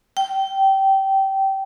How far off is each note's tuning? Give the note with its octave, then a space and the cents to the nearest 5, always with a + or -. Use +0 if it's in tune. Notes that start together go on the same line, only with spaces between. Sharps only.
G5 -20